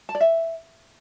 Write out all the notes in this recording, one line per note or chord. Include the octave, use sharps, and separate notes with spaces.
A5
D5
E5